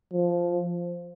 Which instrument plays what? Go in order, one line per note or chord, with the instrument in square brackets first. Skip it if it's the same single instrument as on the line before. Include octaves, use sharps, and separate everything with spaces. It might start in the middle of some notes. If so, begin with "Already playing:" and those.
[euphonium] F3